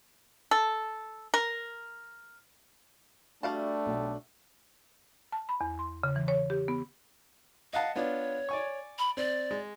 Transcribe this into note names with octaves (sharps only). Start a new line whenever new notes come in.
A4
A#4
G3 A3 D4 F#4 E5 F5 A5
B1
A5
B5
E2
C6
C#3
E3
C#5
G4
B3
D#5 F5 F#5 A5
B3 D4 F4 C#5
D5 G#5 C#6
B5
C4 D5
G#3